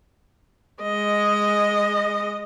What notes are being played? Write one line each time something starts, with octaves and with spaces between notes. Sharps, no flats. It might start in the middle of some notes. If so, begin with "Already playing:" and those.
G#3 D#5